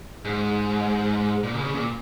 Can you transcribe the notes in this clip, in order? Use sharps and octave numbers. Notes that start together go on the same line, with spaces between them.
G#2
A#2
C#3
C#3
A#2